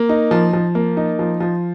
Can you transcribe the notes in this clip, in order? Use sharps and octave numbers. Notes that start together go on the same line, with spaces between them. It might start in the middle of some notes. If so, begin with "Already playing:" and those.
Already playing: A#3
D#4
F3
F3
A#3
D#4
F3
F3